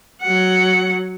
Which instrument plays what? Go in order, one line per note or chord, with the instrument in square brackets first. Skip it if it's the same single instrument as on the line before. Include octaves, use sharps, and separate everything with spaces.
[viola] F#3 F#5